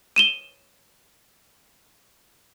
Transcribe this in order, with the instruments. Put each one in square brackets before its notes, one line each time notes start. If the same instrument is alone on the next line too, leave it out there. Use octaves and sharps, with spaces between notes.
[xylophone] D#7 E7 G7